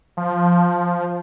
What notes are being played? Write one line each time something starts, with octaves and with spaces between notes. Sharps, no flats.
F3